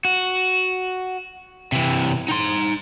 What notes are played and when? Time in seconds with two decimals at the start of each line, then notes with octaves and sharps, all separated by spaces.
0.05 F#4
1.72 C3 E3
2.28 D#4 C6